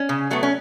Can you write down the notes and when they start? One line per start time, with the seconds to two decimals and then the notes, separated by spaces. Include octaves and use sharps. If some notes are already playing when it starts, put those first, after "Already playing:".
Already playing: C#4
0.09 C#3
0.31 F#3 A3 B3
0.43 C#4